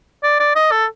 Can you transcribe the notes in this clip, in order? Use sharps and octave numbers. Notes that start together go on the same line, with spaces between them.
D5
D5
D#5
A4